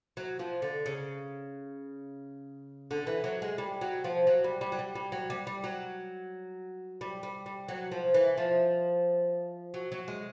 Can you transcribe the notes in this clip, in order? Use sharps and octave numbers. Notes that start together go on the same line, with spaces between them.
F#3
F3
D3
C#3
D3
E3
F#3
G#3
G3
F#3
F3
F#3
G3
G3
F#3
G3
G3
F#3
G3
G3
F#3
G3
G3
G3
F#3
F3
E3
F3
F#3
F#3
G#3